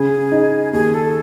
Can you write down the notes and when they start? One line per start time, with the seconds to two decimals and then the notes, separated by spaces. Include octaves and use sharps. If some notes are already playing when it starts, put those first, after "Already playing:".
Already playing: C#3 G#4
0.32 D#4
0.73 D#2 G#4
0.94 A4